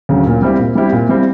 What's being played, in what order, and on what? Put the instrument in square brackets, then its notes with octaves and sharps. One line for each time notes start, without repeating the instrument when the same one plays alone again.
[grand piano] D2 C#3 F#3
A#2
G3 C4 E4 G4
A#2
G3 C4 E4 G4
A#2
G3 C4 E4 G4